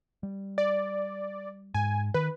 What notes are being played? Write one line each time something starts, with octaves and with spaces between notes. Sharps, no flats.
G3
D5
G#2 G#5
D#3 B4